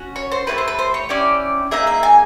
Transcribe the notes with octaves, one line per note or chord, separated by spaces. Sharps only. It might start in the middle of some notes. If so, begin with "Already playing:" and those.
Already playing: C#4 F#4
C#5
C5
A3 C#4 E4 G4 B4
C5
B4
C5
C#5
C#4 E4 G4 D5
A#3 D#4 G#4 E5
E5
G#5